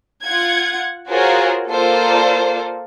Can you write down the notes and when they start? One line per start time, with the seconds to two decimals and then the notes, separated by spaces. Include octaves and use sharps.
0.23 F4 F#5 G#6
1.08 F4 F#4 G#4 A#4 C5 C#5
1.68 A#3 F4 A4 A#4 C5 D5